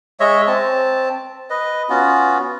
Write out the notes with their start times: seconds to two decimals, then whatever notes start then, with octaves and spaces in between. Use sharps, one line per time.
0.20 G#3 C#5 D#5 E5
0.47 C4 A5
1.50 B4 D#5
1.89 B3 C#4 F4 F#4